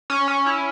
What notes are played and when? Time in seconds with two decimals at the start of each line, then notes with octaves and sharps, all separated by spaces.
0.10 C#4
0.28 C#4
0.46 E4